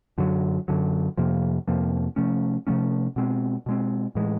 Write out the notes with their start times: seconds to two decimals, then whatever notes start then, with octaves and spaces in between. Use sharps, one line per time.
0.18 F#2 D3 F#3
0.68 F#2 D3 F#3
1.17 F2 C3 F3 A#3
1.68 F2 C3 F3 A#3
2.16 C3 F3 A3 C#4
2.67 C3 F3 A3 C#4
3.16 B2 G#3 C4
3.66 B2 G#3 C4
4.15 A2 E3 G#3